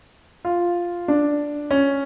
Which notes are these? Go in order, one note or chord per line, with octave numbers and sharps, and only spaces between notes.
F4
D4
C#4